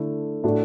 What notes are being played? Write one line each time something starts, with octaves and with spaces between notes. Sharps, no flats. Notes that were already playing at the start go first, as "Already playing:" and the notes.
Already playing: D3 A3 E4 A4
A2 A3 D4 F#4 A4